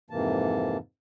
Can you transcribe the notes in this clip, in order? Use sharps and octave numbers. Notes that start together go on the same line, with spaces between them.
F2 G#2 C3 E3 A#3 A5